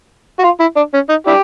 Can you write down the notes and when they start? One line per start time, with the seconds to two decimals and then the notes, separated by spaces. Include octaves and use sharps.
0.39 F#4
0.44 F4
0.60 E4
0.76 D4
0.94 C#4
1.09 D#4
1.27 D4 E4 G4